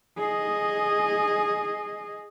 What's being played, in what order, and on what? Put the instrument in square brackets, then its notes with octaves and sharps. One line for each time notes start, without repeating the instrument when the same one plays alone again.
[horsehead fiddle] G#4 D#5